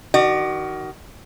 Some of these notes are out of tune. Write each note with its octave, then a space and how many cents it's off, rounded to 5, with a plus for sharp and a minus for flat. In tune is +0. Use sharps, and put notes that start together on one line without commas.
D#3 +0 F#4 +30 D5 +40